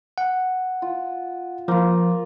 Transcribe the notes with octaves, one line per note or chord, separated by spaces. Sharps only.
F#5
F4
F3 A#3 F4